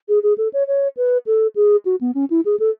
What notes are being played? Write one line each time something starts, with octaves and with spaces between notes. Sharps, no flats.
G#4
G#4
A4
C#5
C#5
B4
A4
G#4
F#4
B3
C#4
E4
G#4
A4